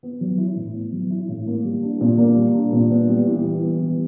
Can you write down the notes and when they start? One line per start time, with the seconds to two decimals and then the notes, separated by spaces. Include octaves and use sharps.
0.03 B3
0.21 F#3
0.38 E4
0.56 A2
0.75 B3
0.92 F#3
1.11 E4
1.28 A2
1.47 A#3
1.64 G3
1.82 D4
2.01 A#2
2.18 A#3
2.36 G3
2.55 D4
2.73 A#2
2.91 B3
3.09 G3
3.27 E3
3.45 E3
3.62 B3
3.81 G3